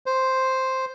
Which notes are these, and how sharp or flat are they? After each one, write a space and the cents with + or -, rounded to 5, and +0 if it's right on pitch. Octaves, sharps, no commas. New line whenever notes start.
C5 +0